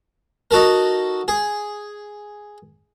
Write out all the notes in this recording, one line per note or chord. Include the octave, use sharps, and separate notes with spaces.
D#4 F#4 A4 A#4
G#4